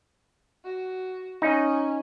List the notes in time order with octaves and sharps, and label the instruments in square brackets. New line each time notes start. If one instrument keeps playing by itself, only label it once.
[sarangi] F#4
[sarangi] C#4 [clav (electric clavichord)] D#4